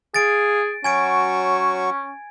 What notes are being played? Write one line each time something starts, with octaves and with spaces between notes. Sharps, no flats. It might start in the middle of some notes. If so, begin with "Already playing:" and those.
G#4 F5 A6 D7
F#3 C#4 F#4 G#5 C#6 G#6 D7